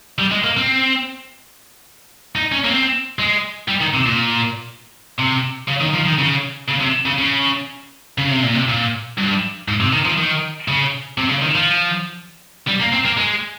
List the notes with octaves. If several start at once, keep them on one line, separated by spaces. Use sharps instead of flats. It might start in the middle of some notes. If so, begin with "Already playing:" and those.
G3
G#3
A#3
C4
D#4
C#4
A#3
C4
G#3
G3
D#3
C3
A#2
C3
C#3
D#3
F3
D#3
C#3
C#3
C3
C#3
C#3
C#3
C3
A#2
C3
A#2
G2
G#2
C3
D#3
F3
D#3
C#3
C3
C#3
D#3
F3
G3
A#3
C4
A#3
G#3